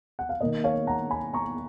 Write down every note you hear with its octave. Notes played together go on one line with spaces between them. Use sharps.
F#5
F5
D#3 A#3 D#5
C#5 F5
F#5 A#5
G#5 B5
A#5 C#6